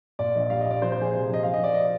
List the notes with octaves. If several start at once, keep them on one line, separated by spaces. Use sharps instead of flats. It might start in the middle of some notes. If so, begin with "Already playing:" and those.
A#2 D5
A#1 D#5
G3 F5
D#5
A#2 D5
F3 C5
C5
F3 G#4
C3
F3
D#5
F3 F5
F3 D#5
D5
D#5